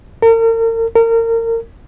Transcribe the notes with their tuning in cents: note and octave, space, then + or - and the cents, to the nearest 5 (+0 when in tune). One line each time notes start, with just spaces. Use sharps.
A#4 -40
A#4 -30